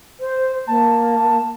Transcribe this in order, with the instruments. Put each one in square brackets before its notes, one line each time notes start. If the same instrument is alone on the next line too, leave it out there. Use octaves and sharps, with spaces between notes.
[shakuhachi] C5
[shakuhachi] A#3 [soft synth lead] A5